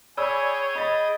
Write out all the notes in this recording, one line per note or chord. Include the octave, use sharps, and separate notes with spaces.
G#4 C#5 D5 G5 G#5 B5 D#6 E6
D#5 B5 A6